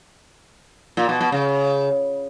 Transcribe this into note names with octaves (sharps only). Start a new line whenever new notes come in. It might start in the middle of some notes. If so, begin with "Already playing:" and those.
A#2
B2
B2
C#3